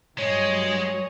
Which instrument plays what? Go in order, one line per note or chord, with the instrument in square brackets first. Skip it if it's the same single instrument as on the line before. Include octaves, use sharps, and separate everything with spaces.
[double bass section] G2 F#3 [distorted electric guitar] G#3 [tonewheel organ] C#5 [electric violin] D#5 G#5